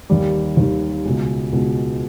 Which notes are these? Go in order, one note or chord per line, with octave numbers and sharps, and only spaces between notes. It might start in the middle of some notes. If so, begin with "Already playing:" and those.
D#2 D#3 G3
D#2 D#3 G3
C#2 B2 G#3
C#2 B2 G#3